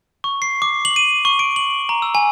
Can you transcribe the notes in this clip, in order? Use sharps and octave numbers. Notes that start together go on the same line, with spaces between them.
C#6
C7
D6
F#7
D#7
C#6
D7
F#7
A#5
E6
G#5